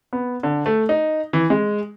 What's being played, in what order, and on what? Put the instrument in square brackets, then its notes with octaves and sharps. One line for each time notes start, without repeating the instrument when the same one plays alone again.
[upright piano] B3
D3
A3
D#4
E3
G#3